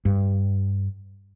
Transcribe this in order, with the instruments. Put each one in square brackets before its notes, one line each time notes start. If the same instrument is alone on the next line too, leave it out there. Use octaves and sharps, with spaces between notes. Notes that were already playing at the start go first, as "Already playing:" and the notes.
[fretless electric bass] G2